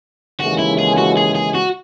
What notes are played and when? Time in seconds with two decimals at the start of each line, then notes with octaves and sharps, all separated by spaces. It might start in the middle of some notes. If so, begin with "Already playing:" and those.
0.40 D#2 C#3 E3 G#3 F#4
0.59 E4
0.78 G#4
0.98 F#4
1.17 G#4
1.35 G#4
1.54 F#4